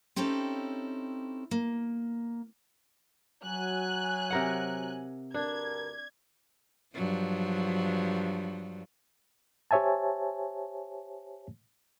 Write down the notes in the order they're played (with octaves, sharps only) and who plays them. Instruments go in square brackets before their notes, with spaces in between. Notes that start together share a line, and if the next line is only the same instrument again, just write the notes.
[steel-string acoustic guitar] C4 C#4 D#4 E4 G4 A4
A#3
[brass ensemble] F#3 [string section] G#5 F#6
[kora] C3 A#4 F#5
[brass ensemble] D2 G2 A#4 [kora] D4 [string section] G#6
[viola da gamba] G2 F3 F#3
[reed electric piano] G4 C5 C#5 E5 G#5 A5